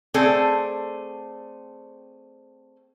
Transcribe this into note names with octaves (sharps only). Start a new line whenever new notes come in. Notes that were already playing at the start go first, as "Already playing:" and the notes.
A3 C4 G#4 A4 D5